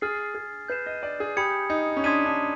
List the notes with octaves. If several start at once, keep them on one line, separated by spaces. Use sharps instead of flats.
G#4 F6 A6 C7
G#4
B4 G6 C7 E7
D#5
D5
G#4
G4 G#5 B5 D#6 G#6 C#7
D#4
C#4
D4 C6 D#6 G#6 B6 D#7
D4